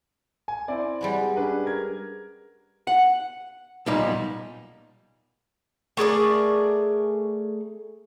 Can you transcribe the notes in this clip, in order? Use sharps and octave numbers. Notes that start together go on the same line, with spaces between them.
G#5
C4 E4 D5
G3 G#3 B3
C#4 D4 B4
A#4 G#6
F#5
B1 A#2 G3 D#4
A3 G#4 A#4 D5